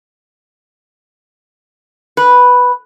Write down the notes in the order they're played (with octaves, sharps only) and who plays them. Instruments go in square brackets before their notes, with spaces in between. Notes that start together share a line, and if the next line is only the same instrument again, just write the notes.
[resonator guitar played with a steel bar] B4